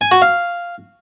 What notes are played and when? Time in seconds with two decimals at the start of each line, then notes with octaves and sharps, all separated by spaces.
0.01 G#5
0.11 F#4
0.22 F5